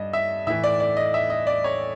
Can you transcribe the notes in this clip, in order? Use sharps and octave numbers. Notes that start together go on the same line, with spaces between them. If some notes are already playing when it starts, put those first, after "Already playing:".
Already playing: G2 D#5
E5
A2 E3 E5
D5
D5
D#5
E5
D#5
D5
C#5